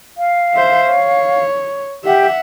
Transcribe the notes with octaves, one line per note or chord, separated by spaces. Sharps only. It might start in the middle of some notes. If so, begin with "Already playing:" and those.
F5
C5 E5
C#5
G4 E5 F#5